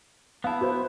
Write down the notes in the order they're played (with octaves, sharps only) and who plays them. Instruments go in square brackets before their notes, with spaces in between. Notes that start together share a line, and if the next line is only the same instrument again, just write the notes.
[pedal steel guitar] B3 E4 [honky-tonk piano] F5 A5
[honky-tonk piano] F#4 B4 C5